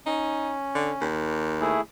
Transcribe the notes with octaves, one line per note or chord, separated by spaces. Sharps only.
C#4 D#4
D3
D#2
A3 E4 G#4